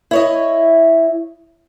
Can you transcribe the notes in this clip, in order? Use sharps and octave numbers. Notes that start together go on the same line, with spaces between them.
E4 C#5 D#5